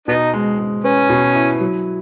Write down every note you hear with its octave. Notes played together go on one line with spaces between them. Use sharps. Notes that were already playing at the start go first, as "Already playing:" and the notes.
B2 B3 D#4
G#3
G#3
B3 C#4
B2
E4
F#3